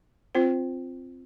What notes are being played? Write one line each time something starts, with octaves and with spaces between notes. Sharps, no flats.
C4 F4 C5